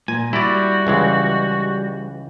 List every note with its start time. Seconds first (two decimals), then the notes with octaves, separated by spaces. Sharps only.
0.08 A#2 G#5
0.33 G3 E4 F#4 D5
0.87 C#2 E3 G#3